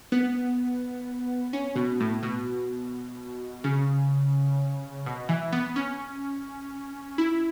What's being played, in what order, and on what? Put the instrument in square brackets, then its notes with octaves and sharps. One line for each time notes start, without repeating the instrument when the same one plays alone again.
[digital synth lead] B3
C#4
B2
A2
B2
C#3
B2
E3
B3
C#4
E4